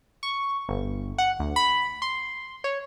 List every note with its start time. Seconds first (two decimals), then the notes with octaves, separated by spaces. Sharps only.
0.23 C#6
0.69 G1
1.18 F#5
1.39 D2
1.56 B5
2.02 C6
2.64 C#5